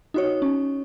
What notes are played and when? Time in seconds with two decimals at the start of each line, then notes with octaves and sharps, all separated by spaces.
0.14 D#4 F#4 C#5
0.42 C#4